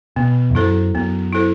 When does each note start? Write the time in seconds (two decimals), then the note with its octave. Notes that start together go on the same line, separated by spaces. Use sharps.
0.16 B2 B3
0.50 E2
0.55 F#2 E4 A4 C5
0.94 F#2 B3
1.33 E4 A4 C5